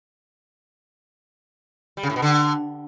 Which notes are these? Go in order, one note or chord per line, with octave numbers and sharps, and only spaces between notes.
G3
C#3
A2
B2
D3